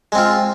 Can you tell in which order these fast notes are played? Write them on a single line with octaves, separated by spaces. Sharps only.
G#3 C4 F4